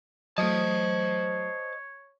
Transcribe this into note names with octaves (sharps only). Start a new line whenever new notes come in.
F#3 A3 C5 C#5 D#5 A5